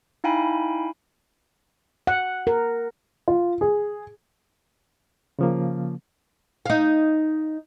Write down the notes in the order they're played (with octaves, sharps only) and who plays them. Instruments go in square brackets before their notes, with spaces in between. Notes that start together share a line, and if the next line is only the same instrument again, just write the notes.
[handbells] D#4 E4 F5 G5 G#5 B5
[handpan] F#5
A#4
[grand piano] F4
G#4
[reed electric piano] C#3 F3 A#3
[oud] D#4 F5